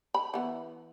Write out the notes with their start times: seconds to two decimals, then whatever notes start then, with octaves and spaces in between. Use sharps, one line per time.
0.14 B5
0.34 E3 B3